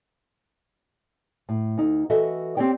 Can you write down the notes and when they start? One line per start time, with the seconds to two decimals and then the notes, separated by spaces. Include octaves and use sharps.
1.49 A2
1.77 D2 D#4
2.10 E3 F#4 A4 D#5 E5
2.57 C4 D4 G4 C#5 D5 G5